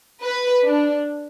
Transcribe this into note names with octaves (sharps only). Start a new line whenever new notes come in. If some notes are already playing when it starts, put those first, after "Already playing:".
B4
D4